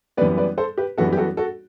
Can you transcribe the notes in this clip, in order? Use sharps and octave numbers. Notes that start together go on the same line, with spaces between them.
F#2 E3 G3 B3 B4 D5
B4 D5
A4 C5
G4 B4
F#2 E3 G3 B3 F#4 A4
G4
F#4 A4
F#4 A4